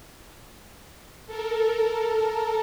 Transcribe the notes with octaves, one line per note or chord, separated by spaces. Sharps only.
A4 A#4